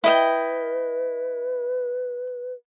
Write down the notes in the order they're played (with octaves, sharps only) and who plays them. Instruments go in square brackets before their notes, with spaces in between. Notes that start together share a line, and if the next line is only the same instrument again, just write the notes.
[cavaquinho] E4 D#5 G5 [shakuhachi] B4